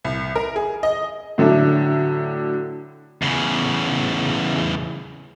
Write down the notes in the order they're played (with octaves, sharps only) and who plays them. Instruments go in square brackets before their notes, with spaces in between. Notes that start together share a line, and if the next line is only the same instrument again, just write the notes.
[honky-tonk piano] C2
A#4
G#4
D#5
[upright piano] A2 D3 F#3 A3 D4
[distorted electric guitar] E2 C#3